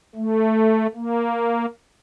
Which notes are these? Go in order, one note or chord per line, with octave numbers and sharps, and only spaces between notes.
A3
A#3